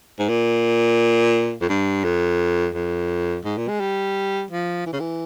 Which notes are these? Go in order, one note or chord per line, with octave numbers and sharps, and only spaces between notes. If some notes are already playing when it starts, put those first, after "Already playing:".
G#2
A#2
F2
G2
F2
F2
G#2
A#2
G#3
G3
F3
E3
C#3
E3